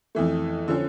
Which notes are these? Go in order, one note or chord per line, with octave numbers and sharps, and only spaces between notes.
F2 E3 A3
D3 F3 C#4